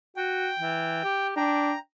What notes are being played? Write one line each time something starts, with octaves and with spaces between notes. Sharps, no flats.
F#4 G5
E3
G4
D4 G5 A#5